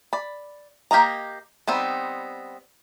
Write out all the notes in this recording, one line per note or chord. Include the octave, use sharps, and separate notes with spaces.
D5 B5
A#3 G4 A#4 D#5 A#5
G3 B3 C4 D#4